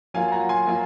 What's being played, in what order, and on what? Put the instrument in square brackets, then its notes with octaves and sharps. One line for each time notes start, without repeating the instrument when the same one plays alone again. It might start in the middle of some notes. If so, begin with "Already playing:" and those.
[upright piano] F#3 A#3 F4 [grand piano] F5 G#5
[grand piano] F#5 A#5
G#5 C6
[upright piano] F#3 A#3 F4